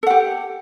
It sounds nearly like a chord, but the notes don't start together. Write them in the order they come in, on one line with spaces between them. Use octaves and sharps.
A4 F#5 G4